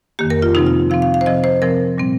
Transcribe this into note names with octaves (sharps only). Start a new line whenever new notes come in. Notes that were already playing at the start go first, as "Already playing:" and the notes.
F2 D#3 A#3 G4
A#4
F4
C3 F3 C4 D#4
F4
C3 F3 C4 F5
F5
F5
C5
C3 F3 C4 D#5
C5
C3 F3 C4 A#4
A#2 G3 C4